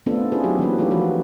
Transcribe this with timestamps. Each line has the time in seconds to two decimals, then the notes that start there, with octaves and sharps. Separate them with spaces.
0.06 A3 B3 C4 D4 F4 A4
0.32 C#4 E4 F4 G#4 B4 C5
0.44 F#3 B3 D#4 F#4 G4
0.59 E3 A#3 C#4 B4
0.78 A3 D#4 F4 G4 A4 C#5
0.91 F3 C#4 F4 F#4 B4